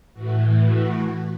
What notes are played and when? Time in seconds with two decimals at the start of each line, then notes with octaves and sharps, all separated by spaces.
0.14 A2 E3 F#4
0.64 F#4